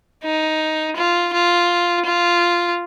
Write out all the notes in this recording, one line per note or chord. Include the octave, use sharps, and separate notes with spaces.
D#4
F4
F4
F4